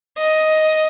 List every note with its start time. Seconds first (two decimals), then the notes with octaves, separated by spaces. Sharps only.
0.18 D#5